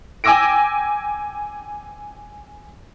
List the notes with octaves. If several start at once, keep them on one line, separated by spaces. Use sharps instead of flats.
G5 G#5 D6 E6 A#6 D7